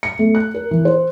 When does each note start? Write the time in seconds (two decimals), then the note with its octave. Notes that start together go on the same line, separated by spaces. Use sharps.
0.03 C#7
0.19 A3
0.35 F#6
0.54 A#4
0.71 E3
0.85 C5